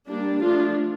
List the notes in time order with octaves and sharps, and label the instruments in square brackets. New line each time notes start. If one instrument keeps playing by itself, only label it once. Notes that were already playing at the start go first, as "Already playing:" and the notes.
[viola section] G3 A#3 D4
F3 A3 D4 F4